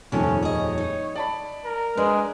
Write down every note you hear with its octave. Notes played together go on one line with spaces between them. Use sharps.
D#1 F2 C3 D#3 A3 C#4
G#4 C#5 D#5
D#4
D5 A5 B5
A#4
G#3 D4 B4